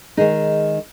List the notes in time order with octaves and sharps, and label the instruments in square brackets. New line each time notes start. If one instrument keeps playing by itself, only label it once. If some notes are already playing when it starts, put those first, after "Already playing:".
[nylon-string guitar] D#3 G#3 D#4 G#4